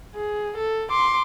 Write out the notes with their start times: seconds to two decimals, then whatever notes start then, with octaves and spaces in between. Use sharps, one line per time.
0.15 G#4
0.57 A4
0.90 C6 D6